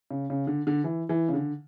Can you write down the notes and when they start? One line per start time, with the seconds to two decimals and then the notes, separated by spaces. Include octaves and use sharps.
0.11 C#3
0.30 C#3
0.47 D3
0.67 D3
0.84 E3
1.09 E3
1.29 C#3
1.34 D3